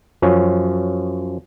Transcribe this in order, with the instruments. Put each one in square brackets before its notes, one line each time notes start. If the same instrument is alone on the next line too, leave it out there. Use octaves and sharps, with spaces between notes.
[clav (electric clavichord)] F#2 F3 C#4